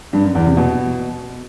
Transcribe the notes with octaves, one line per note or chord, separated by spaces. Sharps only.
G2
F#2
E2
C3
B2